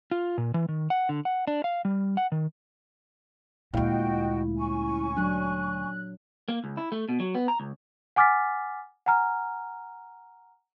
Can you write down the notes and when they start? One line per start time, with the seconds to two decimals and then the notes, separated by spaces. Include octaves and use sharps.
0.11 F4
0.38 A#2
0.54 E3
0.69 D#3
0.90 F#5
1.09 D3
1.25 F#5
1.47 D4
1.64 F5
1.85 G3
2.17 F#5
2.32 D#3
3.74 D2 A#2 G#3 E4 F#4 D#5 F5 G5
4.56 C#4 G#5 C#6
5.17 F#3 D4 F#6
6.49 A#3
6.64 C#2
6.77 E4
6.92 A3
7.09 B2
7.20 F#3
7.34 B3
7.48 A#5
7.60 C#2
8.16 F#5 G#5 D6 F6 A6 B6
9.06 F#5 G#5 A#5 F6